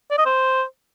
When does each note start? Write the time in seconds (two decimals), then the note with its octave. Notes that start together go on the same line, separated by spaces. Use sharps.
0.10 D5
0.18 D#5
0.26 C5